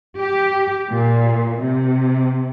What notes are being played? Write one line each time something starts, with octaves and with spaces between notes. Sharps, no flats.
G4
A#2
C3